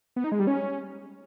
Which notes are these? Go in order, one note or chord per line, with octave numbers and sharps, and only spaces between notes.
B3
D#4
G#3
G3
C#4